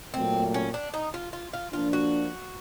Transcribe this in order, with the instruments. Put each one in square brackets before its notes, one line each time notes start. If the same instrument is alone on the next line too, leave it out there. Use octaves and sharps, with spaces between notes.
[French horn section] A#2 F#3 A3 [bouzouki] C4
[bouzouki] C#4
D4
D#4
F4
F4
F4
[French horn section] F3 A#3 D4 [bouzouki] F4
[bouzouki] F#4